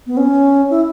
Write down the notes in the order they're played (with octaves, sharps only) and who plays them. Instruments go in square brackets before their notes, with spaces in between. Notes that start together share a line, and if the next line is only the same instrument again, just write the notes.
[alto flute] B3
C#4
E4